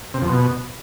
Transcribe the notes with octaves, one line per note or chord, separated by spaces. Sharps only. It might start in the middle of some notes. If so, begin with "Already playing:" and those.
C3
F2
B2